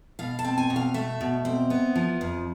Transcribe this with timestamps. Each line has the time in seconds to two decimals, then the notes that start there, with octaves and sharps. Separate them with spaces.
0.19 B2 F5
0.39 A5
0.44 C4
0.58 G#5
0.70 B2
0.76 F5
0.94 A3 E5
1.21 B2
1.45 C4
1.70 B3
1.95 F3
2.21 F2